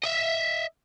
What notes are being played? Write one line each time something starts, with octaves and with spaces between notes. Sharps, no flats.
D#5 E5